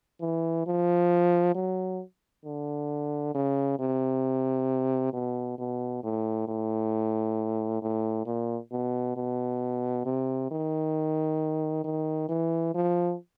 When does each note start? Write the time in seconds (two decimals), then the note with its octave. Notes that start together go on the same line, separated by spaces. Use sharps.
0.21 E3
0.67 F3
1.55 F#3
2.45 D3
3.35 C#3
3.79 C3
5.13 B2
5.58 B2
6.03 A2
6.48 A2
7.82 A2
8.26 A#2
8.72 B2
9.16 B2
10.05 C3
10.51 D#3
11.84 D#3
12.29 E3
12.75 F3